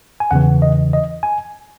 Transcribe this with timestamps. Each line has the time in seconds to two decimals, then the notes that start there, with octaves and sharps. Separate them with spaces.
0.20 G#5
0.31 E2 C#3 E3 F#5
0.62 D#5
0.93 D#5
1.23 G#5